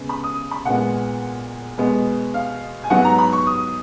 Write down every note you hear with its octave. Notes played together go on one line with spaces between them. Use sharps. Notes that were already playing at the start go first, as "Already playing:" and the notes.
Already playing: C#3 G#3 B3
B5
D#6
B5
A#2 G#3 B3 F#5
B2 G#3 B3
F5
G#5
G#2 F#3 B3 F#5
A#5
B5
C#6
D#6